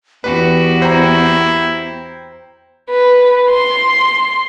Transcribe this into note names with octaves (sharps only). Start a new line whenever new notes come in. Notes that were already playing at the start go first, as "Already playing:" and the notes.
E2 B3 F#4 G4 B4
E4 C5 G5 A#5
B4
C6